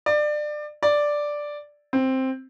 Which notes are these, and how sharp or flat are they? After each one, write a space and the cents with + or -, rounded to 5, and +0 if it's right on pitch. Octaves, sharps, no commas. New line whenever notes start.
D5 +25
D5 +0
C4 +5